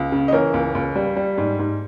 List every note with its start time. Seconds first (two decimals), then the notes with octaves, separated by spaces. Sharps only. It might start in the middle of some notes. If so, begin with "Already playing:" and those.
Already playing: C#2
0.12 C#3
0.28 D#5
0.32 E3 A#4 C#5
0.54 C#2
0.75 C#2
0.95 G3
1.16 G3
1.38 G#2
1.59 G#2